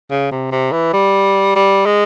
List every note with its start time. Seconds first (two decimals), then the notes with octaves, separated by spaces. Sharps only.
0.11 C#3
0.31 C3
0.52 C3
0.72 E3
0.93 G3
1.56 G3
1.86 G#3